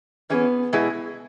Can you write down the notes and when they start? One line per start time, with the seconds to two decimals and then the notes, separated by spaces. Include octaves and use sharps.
0.30 E3 B3 C#4 G#4
0.73 B2 G#3 E4 G#4